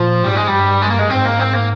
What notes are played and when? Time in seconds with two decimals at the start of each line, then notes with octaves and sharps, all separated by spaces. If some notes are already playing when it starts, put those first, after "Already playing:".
Already playing: A#2 F3
0.24 G#2 G3
0.35 G#3
0.47 G3
0.53 G2
0.82 G#3
0.90 A#3
0.99 G#3
1.10 G#2 C4
1.25 A#3
1.40 C4
1.54 A#3